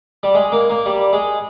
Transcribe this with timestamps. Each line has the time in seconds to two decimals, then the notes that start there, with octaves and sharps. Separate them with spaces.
0.23 G3
0.35 G#3
0.52 A#3
0.70 A#3
0.86 G3
1.13 G#3